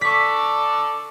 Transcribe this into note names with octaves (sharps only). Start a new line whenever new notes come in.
A4 D5 C#6 B6